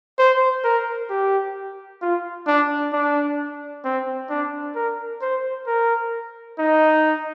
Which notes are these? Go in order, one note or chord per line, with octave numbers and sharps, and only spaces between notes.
C5
A#4
G4
F4
D4
D4
C4
D4
A#4
C5
A#4
D#4